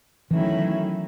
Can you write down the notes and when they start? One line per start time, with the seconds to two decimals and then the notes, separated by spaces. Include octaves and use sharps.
0.31 D#3 E3 F#3 A3 C#4 E4